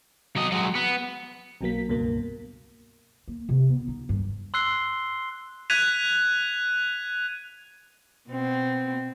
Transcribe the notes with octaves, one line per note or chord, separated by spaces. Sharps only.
F#3 D#5
F#3 G#3
B3
B1 B2 F#3 A#3 B6
C#2 G2 B2 A#3
A#3
C3
B3
D#4
G2
C6 E6 F#6 C7 G7
F#6 G#6 B6 D#7 F7
B2 C4